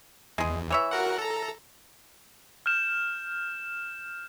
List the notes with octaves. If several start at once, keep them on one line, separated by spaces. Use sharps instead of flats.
E2 G#3 G#4
E3 C#5 E5
F#4 A#4 F#5
A4 A#5
F6 G6 E7